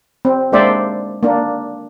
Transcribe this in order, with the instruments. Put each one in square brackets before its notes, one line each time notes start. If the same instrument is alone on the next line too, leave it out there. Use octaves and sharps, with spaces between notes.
[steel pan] C4
G#3 A#3 D4 C5 D5 E5
A#3 D4